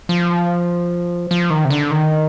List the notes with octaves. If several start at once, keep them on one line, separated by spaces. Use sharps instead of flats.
F3
F3
D#3
C3
D3
D#3